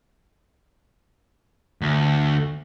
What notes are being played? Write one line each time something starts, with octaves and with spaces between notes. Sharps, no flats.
D2